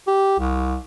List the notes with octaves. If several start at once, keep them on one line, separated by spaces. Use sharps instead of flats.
G4
C2